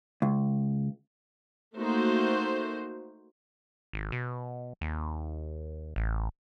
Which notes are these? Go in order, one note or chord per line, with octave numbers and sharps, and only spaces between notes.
C#2
A3 A#3 D#4 F#4 C5
G#1
B2
D#2
A1